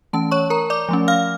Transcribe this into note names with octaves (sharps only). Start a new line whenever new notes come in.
E3 A3 C#4 A5
C#5 C#6
A#4 A#5
D5 D6
F3 A3 C#4
F5 F6